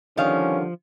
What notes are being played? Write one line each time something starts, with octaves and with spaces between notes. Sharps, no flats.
D3 D#3 F3 G3 C#4 D4 F5